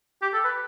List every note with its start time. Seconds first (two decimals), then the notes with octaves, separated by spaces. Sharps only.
0.22 G4
0.33 A4
0.45 B4